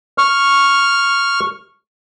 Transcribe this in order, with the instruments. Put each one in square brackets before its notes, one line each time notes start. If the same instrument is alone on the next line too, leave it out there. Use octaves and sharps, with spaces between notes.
[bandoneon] C#6 F6